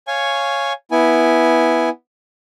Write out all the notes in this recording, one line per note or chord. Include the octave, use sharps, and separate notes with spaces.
C#5 F5 G#5 C#6
B3 E4 G#5